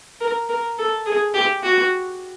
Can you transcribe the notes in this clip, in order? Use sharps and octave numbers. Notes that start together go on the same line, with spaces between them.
A#4
A#4
A4
G#4
G4
F#4